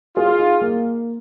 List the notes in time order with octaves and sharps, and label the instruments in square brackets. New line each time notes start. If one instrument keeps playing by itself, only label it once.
[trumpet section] F4 [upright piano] G#4
[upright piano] D#4
A#3